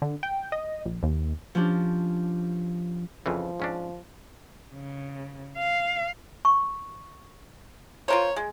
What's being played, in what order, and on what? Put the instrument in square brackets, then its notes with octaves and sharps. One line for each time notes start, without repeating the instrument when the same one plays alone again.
[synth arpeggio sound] D3
G5
D#5
A#1
D#2
[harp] F3 C#4 D4 G4
[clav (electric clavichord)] F2 C#3 E3 [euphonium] F3
[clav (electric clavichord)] G#2 C#4 D4
[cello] C#3
F5
[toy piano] C#6
[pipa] F4 A#4 C5 [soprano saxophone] C#5
[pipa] G#3